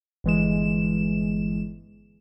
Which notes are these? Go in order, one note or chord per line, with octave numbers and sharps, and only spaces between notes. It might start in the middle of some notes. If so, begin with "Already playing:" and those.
G1 E3 G#3 E7